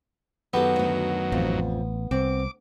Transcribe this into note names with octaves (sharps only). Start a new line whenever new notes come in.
F#2 D#3 F#3 B3 G4 A4
D2 G2
A1 F2
C2 C4 D6